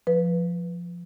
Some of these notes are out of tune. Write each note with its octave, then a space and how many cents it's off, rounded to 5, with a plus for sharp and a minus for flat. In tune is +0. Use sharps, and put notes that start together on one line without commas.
F3 +0 B4 +0